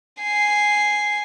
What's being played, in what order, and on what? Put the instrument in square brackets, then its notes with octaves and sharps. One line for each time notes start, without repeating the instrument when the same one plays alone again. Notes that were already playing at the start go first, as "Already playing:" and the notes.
[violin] G#5 C7